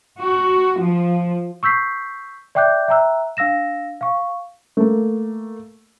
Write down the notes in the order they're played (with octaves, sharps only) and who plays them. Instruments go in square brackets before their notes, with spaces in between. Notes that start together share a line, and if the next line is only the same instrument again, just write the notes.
[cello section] F#4
F3
[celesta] C#6 E6 G6 B6 C7
D5 E5 G5 D6 F#6 G6
E5 G5 A#5 E6 F#6
D4 F5 E6 A#6 E7
F5 C#6
[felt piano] A3 A#3